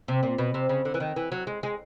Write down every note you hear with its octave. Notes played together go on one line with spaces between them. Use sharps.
C3
A#2
B2
C3
C#3
D3
E3
D#3
E3
F#3
G#3
G#3